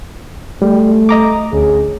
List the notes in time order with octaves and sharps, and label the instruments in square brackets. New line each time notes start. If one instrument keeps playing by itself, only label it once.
[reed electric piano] G3 [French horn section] A3
[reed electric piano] D#5 A#5 D6
[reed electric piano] D2 [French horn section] C#4 G#4